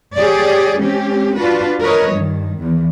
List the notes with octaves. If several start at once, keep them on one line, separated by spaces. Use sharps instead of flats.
G4 G#4 C#5 D5
G#3 C4 C#4 G4
D4 F4 F#4 B4
A#4 B4 C#5 D#5
G2 D#3
E2